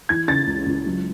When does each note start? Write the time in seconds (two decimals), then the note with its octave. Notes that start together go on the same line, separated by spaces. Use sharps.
0.09 E3 G#6
0.28 C#3 A6
0.47 C#2
0.66 C#2
0.86 F#3